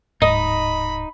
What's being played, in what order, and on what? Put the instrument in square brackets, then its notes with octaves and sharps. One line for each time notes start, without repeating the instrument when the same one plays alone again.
[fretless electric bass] D1 G#2 [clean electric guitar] D#4 [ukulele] D#5 [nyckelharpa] B5